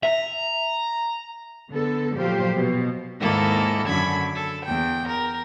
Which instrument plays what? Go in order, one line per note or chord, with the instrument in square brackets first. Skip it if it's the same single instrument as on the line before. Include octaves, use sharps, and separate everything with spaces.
[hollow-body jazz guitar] E5 [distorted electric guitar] A#5
[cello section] D3 B3 A4
A#2 F3 F#3 G4 C5 F5
B2
[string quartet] D#2 G#2 D#3 A#3 E4 A4
F#2 D3 B5 G#6
A4
E2 G5
A#4